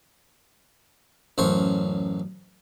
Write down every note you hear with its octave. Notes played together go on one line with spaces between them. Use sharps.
A1 F#2 C5 C#5